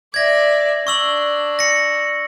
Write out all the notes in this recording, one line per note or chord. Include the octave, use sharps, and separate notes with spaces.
D5 E5 G#6 A#6
D4 C#6 E6 F#7
A#6 C#7